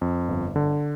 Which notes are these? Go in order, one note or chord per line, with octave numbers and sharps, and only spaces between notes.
F2
G1
D3